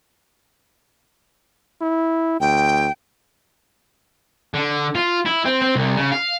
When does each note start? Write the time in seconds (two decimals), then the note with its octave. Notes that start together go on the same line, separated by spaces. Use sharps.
1.81 E4
2.40 D2 G5
4.54 D3
4.95 F4
5.26 E4
5.45 C4
5.62 C4
5.75 C2
5.96 C#3
6.12 F5